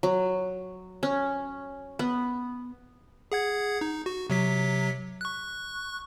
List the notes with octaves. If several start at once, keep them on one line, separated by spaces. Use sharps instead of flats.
F#3
C#4
B3
G#4 F#5 G#6
D#4
F#4
C3 F#3 B6
C#6 F#6